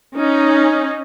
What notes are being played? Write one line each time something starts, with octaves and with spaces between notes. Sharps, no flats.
C#4 D#4